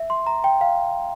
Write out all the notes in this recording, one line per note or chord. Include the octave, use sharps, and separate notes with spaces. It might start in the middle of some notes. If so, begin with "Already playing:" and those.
Already playing: E5
C6
A#5
G5
F5